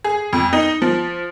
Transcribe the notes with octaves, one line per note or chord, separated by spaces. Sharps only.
G#4
F2
D#4
F3